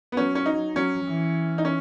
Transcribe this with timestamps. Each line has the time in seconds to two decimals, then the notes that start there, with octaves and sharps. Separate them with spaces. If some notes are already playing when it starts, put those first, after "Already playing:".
0.12 B3
0.17 F#3 C#4
0.35 C#4
0.46 D#4
0.75 F#3 C#4
1.05 E3
1.58 D#4
1.65 C#4